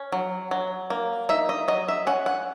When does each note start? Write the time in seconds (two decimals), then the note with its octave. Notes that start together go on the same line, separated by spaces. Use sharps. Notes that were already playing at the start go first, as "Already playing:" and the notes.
Already playing: C#4
0.12 F#3
0.51 F#3
0.90 A#3
1.29 D#4 E5
1.49 D#5
1.68 F#3 D#5
1.88 E5
2.07 C#4 F#5
2.26 F#5